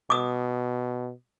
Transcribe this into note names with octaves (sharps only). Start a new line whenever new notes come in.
B2 D6 D#6